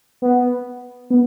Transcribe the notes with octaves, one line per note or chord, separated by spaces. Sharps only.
B3
B3